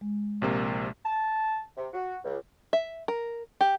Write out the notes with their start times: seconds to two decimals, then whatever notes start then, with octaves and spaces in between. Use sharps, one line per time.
0.01 G#3
0.42 A#1 C3 A#3
1.05 A5
1.77 C3
1.94 F#4
2.25 C#2
2.73 E5
3.08 A#4
3.61 G4